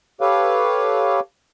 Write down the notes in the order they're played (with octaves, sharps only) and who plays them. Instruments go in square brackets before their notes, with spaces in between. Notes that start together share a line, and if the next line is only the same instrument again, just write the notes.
[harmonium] G4 A4 B4 C#5 F5